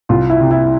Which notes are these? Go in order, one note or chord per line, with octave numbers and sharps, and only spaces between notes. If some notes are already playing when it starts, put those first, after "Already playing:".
C2 F4
E4
C3
E4